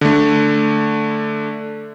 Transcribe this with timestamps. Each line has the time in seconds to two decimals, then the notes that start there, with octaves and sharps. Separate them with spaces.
0.01 D3 A3